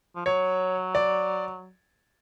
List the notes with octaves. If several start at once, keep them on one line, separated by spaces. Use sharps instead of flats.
F3
F#3 C#5
D5